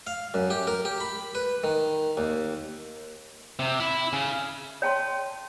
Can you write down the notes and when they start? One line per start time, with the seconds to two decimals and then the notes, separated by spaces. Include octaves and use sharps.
0.07 F5
0.34 F#2
0.50 G4
0.67 A#4
0.85 G4
1.00 B5
1.35 B4
1.64 D#3
2.17 D#2
3.59 C3
3.80 E4
4.13 C#3
4.82 C#5 G5 A5 C6